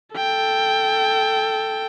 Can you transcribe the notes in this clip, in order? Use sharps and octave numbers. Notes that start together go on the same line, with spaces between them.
A4 G5